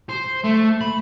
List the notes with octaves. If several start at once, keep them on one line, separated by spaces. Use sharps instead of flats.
C5
A3
B5